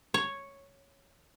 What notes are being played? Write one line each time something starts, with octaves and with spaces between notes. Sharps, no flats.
C#5